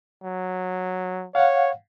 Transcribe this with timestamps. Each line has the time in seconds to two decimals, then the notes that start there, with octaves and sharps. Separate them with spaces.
0.23 F#3
1.35 C#5 F5 F#5